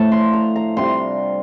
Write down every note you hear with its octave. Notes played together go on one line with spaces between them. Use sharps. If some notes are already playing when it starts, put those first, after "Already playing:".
Already playing: A2 F3 A3 D4 A5
C6
A#5
A#5
C3 G3 D4 F4 C6